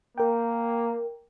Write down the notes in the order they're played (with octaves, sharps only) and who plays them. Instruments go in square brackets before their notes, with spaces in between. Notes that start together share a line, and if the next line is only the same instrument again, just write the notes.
[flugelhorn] A#3 [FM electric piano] A#4 G5